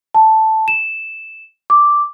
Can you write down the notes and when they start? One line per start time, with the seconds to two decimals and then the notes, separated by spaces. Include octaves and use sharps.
0.15 A5
0.68 E7
1.70 D6